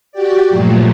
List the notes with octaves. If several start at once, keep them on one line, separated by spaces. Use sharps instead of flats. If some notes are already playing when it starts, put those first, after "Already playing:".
F#4 G4 D5
G2 A#2 F3 F#3 A3